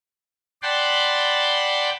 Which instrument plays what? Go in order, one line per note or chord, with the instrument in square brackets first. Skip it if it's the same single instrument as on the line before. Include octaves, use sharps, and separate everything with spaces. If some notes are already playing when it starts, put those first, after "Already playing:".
[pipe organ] D5 F#5 G5 A5 B5 C6